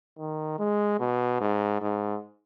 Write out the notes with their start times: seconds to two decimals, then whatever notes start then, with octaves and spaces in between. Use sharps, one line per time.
0.19 D#3
0.59 G#3
1.00 B2
1.41 G#2
1.81 G#2